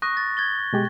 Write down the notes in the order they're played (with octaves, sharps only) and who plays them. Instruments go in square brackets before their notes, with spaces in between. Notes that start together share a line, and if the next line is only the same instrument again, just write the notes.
[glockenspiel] C#6 F#6 A#6 [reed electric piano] D#6
[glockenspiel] A6
G#6 A6 G7
[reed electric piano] B2 G#3 G4